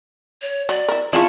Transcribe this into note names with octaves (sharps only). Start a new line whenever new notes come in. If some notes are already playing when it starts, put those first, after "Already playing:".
C#5
F#3 D5
E4 A#4
G#3 C#4 E4 F4 D5 A5 C#6